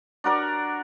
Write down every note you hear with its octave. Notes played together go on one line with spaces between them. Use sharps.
D4 F#4 A#4 D5